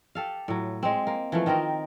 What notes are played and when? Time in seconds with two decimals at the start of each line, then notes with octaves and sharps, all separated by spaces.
0.15 G4 A4 F5
0.48 A2 F#3
0.83 G#3 C4
1.07 A#3
1.32 E3 F3 A3
1.46 D#3 C4 D#4 A#4